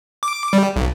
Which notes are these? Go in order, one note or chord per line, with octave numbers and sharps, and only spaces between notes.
D6
G3
B1